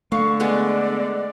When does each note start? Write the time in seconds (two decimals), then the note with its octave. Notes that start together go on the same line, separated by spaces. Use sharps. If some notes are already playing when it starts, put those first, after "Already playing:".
0.12 D3 A3 F5 C#6
0.40 G#3 B3 G#4 D5